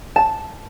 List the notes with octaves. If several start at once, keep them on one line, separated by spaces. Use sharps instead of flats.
A5